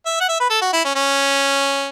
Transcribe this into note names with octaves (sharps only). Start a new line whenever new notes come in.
E5
F#5
E5
B4
A4
F#4
E4
C#4
C#4